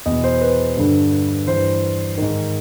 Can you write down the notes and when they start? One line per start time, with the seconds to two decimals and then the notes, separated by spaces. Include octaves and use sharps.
0.06 E2 B2 D#5
0.24 C5
0.41 B4
0.77 G2 D3
1.47 G2 E3 C5
2.17 G#2 D#3